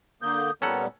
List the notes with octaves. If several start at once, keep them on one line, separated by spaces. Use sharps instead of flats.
D3 A#3 D#6 G6
A#2 G3 B3 C#4 A4 F#5 A#5